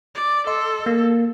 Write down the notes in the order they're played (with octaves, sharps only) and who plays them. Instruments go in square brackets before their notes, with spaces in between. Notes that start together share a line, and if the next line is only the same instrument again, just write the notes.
[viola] D5
[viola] A4 [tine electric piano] D#5 C6
[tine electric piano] A#3